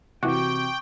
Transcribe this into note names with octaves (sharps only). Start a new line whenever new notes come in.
C3 E3 F#4 G5 C#6 D6